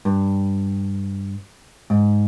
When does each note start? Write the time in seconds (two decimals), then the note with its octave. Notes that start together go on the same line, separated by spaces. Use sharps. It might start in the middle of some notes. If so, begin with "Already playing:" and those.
0.05 G2
1.90 G#2